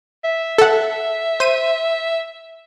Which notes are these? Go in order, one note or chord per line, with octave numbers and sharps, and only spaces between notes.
E5
A4 F#5
C5 D#7